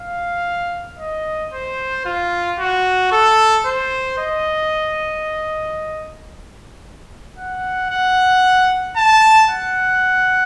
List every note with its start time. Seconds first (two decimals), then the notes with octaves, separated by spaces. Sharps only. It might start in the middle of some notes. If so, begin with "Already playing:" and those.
Already playing: F5
0.99 D#5
1.53 C5
2.05 F4
2.59 F#4
3.12 A4
3.66 C5
4.18 D#5
7.38 F#5
7.90 F#5
8.96 A5
9.50 F#5